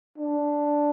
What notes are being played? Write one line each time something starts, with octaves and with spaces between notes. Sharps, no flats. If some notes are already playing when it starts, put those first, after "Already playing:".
D4